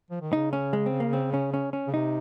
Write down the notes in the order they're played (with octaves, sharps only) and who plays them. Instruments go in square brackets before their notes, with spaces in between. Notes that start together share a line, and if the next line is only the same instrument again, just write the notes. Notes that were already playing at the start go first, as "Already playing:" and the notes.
[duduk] F3
D#3
[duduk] C#3 [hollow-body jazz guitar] D#4
[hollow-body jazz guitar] C#4
G#3
C4
A#3
C4
C#4
C#4
C#4
[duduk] C#3
[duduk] C3 [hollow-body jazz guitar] D#4